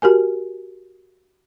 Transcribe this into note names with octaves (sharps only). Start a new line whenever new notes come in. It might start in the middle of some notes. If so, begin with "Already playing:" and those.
F#4 G4 A#4 G#5